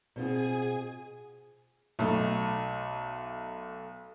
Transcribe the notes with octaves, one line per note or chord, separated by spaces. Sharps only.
B2 C4 F4 G#4 G#5
B1 A3